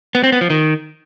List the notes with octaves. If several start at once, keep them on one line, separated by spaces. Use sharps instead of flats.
B3
C4
B3
F3
D#3